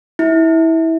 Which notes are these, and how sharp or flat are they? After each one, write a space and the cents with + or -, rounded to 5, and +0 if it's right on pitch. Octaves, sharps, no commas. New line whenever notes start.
E4 -20